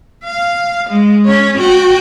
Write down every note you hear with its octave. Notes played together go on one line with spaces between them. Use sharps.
F5
G#3
C#4 C#5
F#4 G5